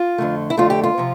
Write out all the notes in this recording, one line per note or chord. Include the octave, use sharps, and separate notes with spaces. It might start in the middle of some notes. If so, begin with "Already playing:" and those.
Already playing: F4
F2 D3 A3
E4
F2 D3 A3 F4
G4
F4
C3 F3